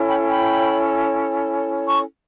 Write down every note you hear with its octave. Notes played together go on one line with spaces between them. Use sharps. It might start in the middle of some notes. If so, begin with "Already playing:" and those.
Already playing: C#4 E4 A4 C#5
G5 B5
G5 B5
A5 C#6